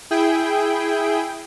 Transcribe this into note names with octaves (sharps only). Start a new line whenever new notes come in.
E4 G#4 G5